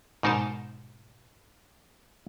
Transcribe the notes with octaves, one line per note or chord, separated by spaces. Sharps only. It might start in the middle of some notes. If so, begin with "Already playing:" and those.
G#2 B2 D#4 A#4 C5 A5